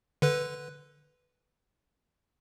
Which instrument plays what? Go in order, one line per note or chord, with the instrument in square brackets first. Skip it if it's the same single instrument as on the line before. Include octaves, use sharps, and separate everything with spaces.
[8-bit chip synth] D3 B4